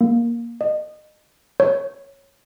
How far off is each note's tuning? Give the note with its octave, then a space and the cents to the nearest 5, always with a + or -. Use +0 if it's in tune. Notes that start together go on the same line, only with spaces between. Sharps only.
A#3 +10
D#5 -25
C#5 -5